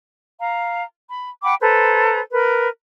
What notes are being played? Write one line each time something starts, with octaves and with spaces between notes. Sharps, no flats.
F5 A#5
B5
F#5 G5 B5 D6
A4 B4 C5 A#5
A#4 B4